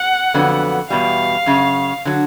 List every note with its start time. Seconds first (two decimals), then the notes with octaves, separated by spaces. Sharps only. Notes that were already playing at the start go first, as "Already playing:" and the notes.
Already playing: F#5
0.34 F2 D3 F#3 B3
0.90 E2 B2 G3 F5
1.46 F#2 C#3
2.05 D3 F#3